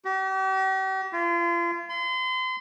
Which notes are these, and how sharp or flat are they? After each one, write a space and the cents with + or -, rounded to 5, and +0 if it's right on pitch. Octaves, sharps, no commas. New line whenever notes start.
G4 -45
F4 -35
C6 -35